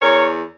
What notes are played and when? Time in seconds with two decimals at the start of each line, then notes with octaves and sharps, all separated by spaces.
0.01 E2 A#4 C#5